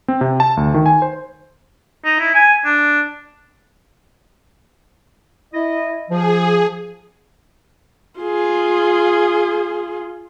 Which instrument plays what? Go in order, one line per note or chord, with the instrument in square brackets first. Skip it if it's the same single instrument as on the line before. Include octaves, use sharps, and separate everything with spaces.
[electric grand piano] C4
C3
A5
D2
D#3
G#5
C5
[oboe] D#4
E4
G#5
D4
[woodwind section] E4 D#5
[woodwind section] F3 [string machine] G#4
[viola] F4 G#4